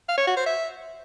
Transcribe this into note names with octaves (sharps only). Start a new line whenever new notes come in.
F5
C#5
F#4
C5
E5